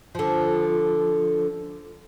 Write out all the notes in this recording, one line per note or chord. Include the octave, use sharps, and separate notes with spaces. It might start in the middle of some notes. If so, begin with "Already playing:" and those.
D3 F3